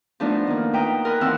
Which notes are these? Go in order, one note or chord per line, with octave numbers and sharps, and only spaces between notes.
F3 A3 B3 D4 D#4 F4
D#3 A#3
F4 B4 E5 G5 A#5 D#6
A#4 G#5 B5 F#6
D#2 E3 C4 A#4 F#5 E6